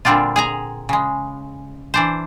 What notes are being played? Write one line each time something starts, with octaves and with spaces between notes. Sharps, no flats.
A#2 D3 G3 C4 D4 F4
G#4 G#5 A#5
C#3 G#3
E3 D4 C5